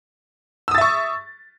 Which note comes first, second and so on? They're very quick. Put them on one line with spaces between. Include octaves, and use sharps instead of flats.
E6 D#6 A6 E5 C#6